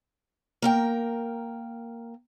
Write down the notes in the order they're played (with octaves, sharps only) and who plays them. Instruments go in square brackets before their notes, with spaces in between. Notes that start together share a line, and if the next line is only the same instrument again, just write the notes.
[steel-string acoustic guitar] A#3 A#4 G5